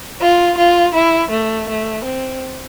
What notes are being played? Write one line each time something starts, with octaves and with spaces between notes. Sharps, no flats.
F4
F4
E4
A3
A3
C4